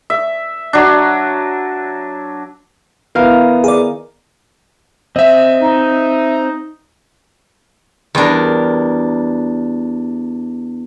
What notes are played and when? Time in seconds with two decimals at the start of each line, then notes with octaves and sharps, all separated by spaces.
0.10 E5
0.73 F#3 D4
3.15 D#3 B3 E4 A#4 F5
3.64 G#4 D5
5.16 C4 D#5 E5
5.61 D#4
8.15 E2 G3 D4 A#4